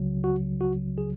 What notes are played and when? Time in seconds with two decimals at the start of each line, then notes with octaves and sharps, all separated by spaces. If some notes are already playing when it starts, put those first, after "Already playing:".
Already playing: C#2 C#3 F#3
0.24 F#4
0.61 F#4
0.98 G#4